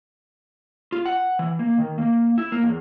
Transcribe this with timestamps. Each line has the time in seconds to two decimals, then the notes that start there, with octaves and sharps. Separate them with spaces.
0.92 F4
1.06 F#5
1.39 E3
1.59 A#3
1.78 D#3
1.98 A#3
2.38 E4
2.52 A#3
2.64 E2